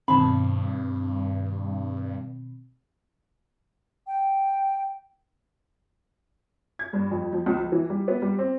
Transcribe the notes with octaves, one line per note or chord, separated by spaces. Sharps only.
G2 B2 D#3 C4 A5 B5
G5
G#6
G2
F2
F3
C#2
F3
E3
G3
B3
G3
C4